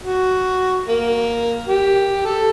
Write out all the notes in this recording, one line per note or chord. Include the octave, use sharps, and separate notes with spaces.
F#4
A#3
G4
A4